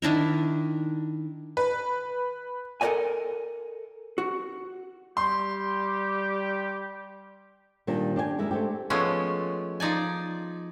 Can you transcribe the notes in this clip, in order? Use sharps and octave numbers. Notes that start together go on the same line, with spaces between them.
D#3 D4 E4 A#4
B4
A4 A#4 C5 D5 D#5 G#5
F#4
G3 G4 C6
A#2 D#3 G3 D4
D4 G4 D5 G#5
F#2 G#3 E4 A#4
A3 C4 G4
F3 G#3 A3 B3 C#4
F3 D#4 D5 G#5